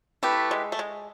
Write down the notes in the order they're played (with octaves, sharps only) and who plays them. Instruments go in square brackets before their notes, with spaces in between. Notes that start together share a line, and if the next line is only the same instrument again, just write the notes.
[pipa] A3 [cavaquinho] E4 G4 B4
[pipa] G#3
A3
G#3